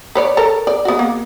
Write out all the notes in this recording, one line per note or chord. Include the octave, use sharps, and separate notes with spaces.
B4 C#5 D5
A4 A#4 C#5
D5
B3 F#4
A#3